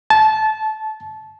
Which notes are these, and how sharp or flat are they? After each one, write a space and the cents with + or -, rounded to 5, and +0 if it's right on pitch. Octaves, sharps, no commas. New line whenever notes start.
A5 -20